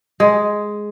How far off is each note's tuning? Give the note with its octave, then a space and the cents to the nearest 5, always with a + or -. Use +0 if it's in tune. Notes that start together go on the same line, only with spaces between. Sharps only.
G#3 +5